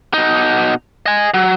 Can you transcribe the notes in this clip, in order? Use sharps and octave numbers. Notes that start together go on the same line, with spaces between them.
B2 D#4
D#5 G#5
F#3